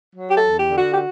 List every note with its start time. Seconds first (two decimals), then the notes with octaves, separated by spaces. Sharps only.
0.16 F#3
0.29 G4
0.36 A4
0.43 E2
0.57 G4
0.70 D3
0.76 F#4
0.93 G4
0.96 F#4